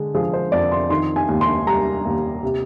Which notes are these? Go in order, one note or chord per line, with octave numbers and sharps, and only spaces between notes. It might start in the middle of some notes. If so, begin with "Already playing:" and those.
Already playing: D3 G#3
F3 G#4
C5
F2 D5
C6
D#3 C6
G#5
D#2
C6
G3 A#5
D#2
C3